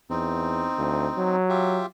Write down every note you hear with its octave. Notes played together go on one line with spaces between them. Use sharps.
E2 C4 D#4
D2
F#3
F4 G4 E5